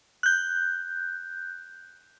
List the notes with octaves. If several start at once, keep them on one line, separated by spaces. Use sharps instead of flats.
F#6 G6